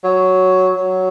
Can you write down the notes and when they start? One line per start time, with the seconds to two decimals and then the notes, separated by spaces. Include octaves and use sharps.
0.04 F#3
0.76 F#3